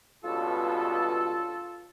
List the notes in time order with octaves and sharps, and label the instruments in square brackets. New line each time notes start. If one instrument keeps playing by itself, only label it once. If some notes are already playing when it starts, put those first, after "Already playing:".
[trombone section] C#2 G2 B2 [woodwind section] F4 A4